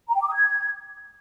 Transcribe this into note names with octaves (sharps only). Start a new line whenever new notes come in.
A#5
G5
D6
D#6
G#6